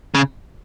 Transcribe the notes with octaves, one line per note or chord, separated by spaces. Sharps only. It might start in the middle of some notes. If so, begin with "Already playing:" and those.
C#3